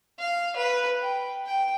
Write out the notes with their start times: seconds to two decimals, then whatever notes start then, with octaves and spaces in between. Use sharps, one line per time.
0.19 F5
0.56 B4
1.00 G5
1.46 G5